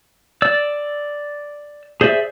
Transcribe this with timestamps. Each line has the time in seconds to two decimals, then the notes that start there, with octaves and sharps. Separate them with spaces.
0.42 D5 E6
2.01 G#4 C5 D5 E5